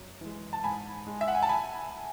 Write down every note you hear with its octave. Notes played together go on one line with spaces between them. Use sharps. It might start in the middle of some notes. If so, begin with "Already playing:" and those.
Already playing: F#2
E3 G#3
A5
G#2 G#5 B5
G#3
E5
F#5
G#5
A5
G#5 B5